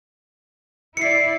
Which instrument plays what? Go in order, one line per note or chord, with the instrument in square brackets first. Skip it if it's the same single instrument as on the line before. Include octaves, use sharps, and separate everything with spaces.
[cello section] E4 D5 [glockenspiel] C7 C#7